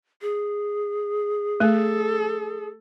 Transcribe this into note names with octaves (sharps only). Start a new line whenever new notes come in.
G#4
A3 A4